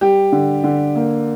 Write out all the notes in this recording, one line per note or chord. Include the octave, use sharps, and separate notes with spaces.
G3 G4
D3
D3
A#3